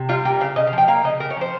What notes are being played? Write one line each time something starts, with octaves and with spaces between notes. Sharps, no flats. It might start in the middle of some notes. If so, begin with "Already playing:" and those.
Already playing: C3
G3 F4
A#3 G4
C#3 F5
C#3 D#5
F5
F3 G5
A#3 F5
C#3 D#5
C#3 A#4
C#5
F3 C5